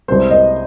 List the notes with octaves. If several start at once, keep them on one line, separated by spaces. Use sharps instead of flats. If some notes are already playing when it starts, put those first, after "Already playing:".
C2 C3 G#3 C5
D#5